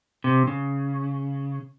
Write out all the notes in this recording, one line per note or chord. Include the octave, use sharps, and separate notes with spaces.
C3
C#3